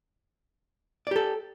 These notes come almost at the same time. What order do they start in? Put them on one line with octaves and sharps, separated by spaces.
D5 G4 A4